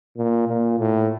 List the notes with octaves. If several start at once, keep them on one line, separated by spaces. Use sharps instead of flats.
A#2
A#2
A2